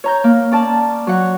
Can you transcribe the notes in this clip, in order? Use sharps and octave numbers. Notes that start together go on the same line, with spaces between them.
C#5 A#5 G6
A#3
C#4 D5 A5
F#3 C#5 F#5